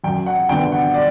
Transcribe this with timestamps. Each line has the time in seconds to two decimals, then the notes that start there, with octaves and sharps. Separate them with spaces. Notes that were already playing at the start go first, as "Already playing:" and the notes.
0.04 F#2 G5
0.26 F#5
0.49 D3 G3 B3 G5
0.72 F#5
0.94 D5